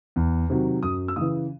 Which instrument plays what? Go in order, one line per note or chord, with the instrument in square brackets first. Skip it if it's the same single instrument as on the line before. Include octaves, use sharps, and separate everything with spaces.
[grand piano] E2
C3 D#3 F#3
F#2 D#6
E6
C#3 E3 D#6